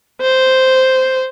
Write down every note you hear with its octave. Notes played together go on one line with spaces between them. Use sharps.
C5